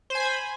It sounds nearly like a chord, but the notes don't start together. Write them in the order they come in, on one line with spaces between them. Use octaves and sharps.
C5 G#5 B5